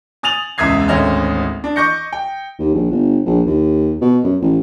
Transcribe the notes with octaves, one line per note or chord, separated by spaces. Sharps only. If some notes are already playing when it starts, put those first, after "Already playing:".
G#5 D#6 A6 D#7 F7 F#7
E1 C#2 E5 D#6 G#6 C7
G#1 D2 C#4 D#5 E5 F6
D4
D#5 C#6 D6 G6 A#6 C#7
G5
D#2
A#1
G1
A#1
D#2
B2
F#2
A1